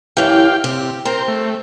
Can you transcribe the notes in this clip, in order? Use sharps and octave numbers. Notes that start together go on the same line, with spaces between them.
F#2 E3 G4 F5 G5
C3 G4
C4 A#4 C5
A3